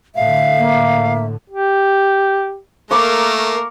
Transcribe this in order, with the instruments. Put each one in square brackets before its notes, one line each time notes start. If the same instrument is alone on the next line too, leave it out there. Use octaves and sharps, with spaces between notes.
[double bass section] A2 D3 [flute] E5 [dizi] F5
[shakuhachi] A#3
[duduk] G4
[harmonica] A3 [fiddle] A#3 A#4 [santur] C#6 D6